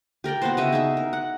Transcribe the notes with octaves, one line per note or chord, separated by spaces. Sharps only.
G4 A#4 D5 G5
B3 F#4 C5
C#3 D#5 E5
D#4 G#4 E5
A#4
F#5